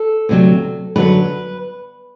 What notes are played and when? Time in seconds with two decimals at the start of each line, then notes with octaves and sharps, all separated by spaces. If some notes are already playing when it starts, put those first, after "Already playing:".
Already playing: A4
0.29 D2 C3 F#3
0.96 F#2 D3 F#3 B4